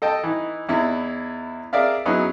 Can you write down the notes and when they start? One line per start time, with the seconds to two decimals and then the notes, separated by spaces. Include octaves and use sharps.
0.02 A4 D#5 G5 A5
0.24 E3 D#4
0.69 E2 D#4 E4
1.73 G#4 A#4 D5 E5 F5
2.05 F#3 B3 C#4 D#4 E4 G#4